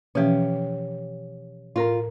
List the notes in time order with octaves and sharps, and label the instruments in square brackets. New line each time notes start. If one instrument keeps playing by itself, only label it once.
[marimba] B2 E3 F3 [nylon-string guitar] C#4 G4
[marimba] A2 A#4 A#5 [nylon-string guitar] F4